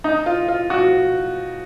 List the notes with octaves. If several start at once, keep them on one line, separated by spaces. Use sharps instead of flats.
D#4
F4
F4
F#4